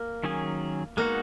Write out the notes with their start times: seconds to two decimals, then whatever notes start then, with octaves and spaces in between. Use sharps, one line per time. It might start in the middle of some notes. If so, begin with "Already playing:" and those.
Already playing: A#3
0.24 D#3 F#3 C#4 G#4
0.97 G#3 A#3 B3 D#4 F#4